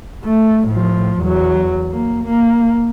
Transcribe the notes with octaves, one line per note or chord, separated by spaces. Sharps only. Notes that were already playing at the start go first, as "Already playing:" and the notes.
A3
A2 F3
E2 F#3
A#3
A#3